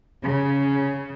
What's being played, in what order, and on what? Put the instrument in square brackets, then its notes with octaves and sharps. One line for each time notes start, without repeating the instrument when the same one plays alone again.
[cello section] C#3